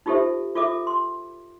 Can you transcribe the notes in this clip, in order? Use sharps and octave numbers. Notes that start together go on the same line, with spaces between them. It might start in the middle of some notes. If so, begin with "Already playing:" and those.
D#4 F4 G4 A4 C5 E5
F4 G#4 A4 E5 D6
C6